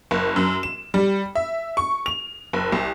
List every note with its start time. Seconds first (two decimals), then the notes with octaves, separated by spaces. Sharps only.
0.11 F#1
0.36 F#2
0.63 E7
0.94 G3
1.35 E5
1.77 C#6
2.06 F7
2.53 F#1
2.72 C2